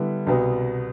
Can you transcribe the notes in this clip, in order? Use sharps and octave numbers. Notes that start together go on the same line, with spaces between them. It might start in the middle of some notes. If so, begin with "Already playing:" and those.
Already playing: D3 G3 B3 E4
C2 B2 B3